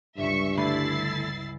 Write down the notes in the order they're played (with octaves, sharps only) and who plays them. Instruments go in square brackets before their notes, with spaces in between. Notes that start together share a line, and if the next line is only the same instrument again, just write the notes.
[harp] G1 C#2 [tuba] G2 [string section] E5 C#6
[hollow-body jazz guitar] D3 A3 B5 [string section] E4 A6 C7